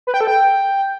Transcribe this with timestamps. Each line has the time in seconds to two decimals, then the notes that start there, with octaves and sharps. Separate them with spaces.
0.07 B4
0.14 G5
0.21 A4
0.27 G5